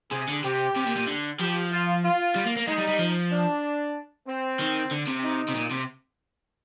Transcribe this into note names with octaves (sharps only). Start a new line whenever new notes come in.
C3 G#4
D3
C3 G4
C3
A#2
A#2
D3
F3 G4
F4
F4
G3
A#3
A#3
G#3 D#4
G3
G3
F3
D4
C4
D#3
D3
C3
D#4
C3
A#2
C3